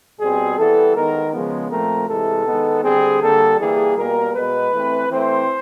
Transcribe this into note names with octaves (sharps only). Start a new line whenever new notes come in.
B2 G3 C4 G#4
E3 G3 B3 A4
D#3 G#3 B3 A#4
C#3 F3 G#3 B3
A#2 F3 A3 C4 A#4
C3 E3 G#3 A4
D#3 G#3 B3
D3 G3 C4 G#4
D3 G3 A#3 A4
E3 G3 A#3 G#4
B2 G3 A#3 A#4
B2 G#3 B3 B4
E3 A3 C4
E3 A3 C4 C5